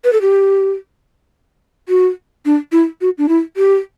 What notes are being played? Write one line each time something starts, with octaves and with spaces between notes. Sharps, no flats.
B4
A4
G4
F#4
D4
E4
F#4
D4
E4
G4